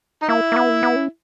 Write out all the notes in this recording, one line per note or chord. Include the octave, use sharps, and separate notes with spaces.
D#4
A#3 E4
A#3
B3
A#3
B3
C#4